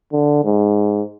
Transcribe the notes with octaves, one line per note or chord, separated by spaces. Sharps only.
D3
G#2